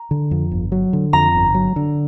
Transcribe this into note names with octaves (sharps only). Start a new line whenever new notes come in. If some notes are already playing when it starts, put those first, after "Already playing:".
Already playing: A#5
D3
F2
G1
F#3
D3
F2 A#5
G1
F#3
D3